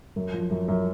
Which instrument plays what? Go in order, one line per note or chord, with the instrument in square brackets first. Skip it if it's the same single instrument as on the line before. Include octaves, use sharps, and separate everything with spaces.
[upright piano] F#2
F3
F#2
F#2